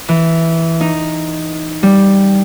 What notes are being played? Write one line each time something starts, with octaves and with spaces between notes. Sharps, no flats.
E3
D#4
G3